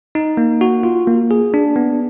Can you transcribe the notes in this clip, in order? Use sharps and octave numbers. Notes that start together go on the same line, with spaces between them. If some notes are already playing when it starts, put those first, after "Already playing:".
D#4
A#3
F#4
F4
A#3
G#4
D4
B3